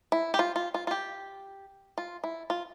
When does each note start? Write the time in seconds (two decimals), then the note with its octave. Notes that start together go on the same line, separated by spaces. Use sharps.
0.12 E4
0.34 G4
0.39 F4
0.56 F4
0.74 F4
0.87 F4
0.91 G4
1.98 F4
2.24 E4
2.50 F4